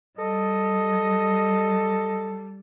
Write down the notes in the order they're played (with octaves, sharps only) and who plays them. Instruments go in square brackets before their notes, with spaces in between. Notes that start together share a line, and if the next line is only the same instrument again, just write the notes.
[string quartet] G3 [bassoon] A4 [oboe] D#5